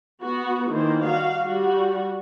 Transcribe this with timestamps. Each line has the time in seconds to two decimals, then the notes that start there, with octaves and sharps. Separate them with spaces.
0.22 B3 F#4
0.69 D#3 E3 A#3 C5
1.04 G3 F#4 F5
1.44 G3 F#4